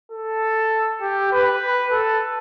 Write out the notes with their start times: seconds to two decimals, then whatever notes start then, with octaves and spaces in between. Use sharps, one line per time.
0.12 A4
1.01 G4
1.32 B4
1.91 A4